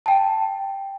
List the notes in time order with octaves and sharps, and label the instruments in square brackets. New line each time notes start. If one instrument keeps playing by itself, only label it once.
[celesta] G5 A5